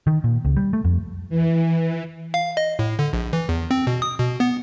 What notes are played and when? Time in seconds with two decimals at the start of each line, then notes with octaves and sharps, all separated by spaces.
0.07 D#3
0.24 A#2
0.45 C#2
0.57 G3
0.73 A3
0.85 F2
1.29 E3
2.34 F5
2.57 D#5
2.79 A2
2.99 D3
3.13 A#1
3.33 E3
3.49 E2
3.71 C4
3.87 B2
4.02 D#6
4.19 B2
4.40 B3